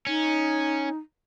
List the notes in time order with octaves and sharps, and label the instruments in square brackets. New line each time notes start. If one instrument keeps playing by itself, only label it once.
[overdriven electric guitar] C#4 [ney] D#4